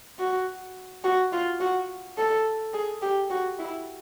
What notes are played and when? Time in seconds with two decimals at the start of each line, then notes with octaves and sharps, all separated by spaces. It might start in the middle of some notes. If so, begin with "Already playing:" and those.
0.19 F#4
1.04 F#4
1.33 F4
1.60 F#4
2.18 A4
2.74 G#4
3.02 G4
3.30 F#4
3.59 E4